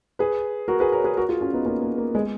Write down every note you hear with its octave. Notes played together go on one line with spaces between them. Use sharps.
G#4 B4
F#4 A#4
G#4 B4
A#4 C#5
G#4 B4
F#4 A#4
F4 G#4
C#4 F4
B3 D#4
A#3 C#4
A#3
A#3
G#3 B3